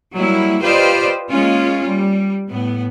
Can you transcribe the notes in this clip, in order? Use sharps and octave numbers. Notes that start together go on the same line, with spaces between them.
F#3 G3 A#3 E4
F4 G4 B4 C5 D5 D#5
G#3 A#3 C#4 F4
G3
A2 B3